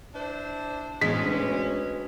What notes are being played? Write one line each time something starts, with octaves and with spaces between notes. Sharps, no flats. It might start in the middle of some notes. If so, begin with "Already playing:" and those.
D4 E4 C5
D2 A2 E3 G#3 B3 C#4 B6
D4 F#4 B4